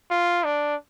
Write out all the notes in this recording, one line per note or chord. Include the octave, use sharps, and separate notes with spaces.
F4
D4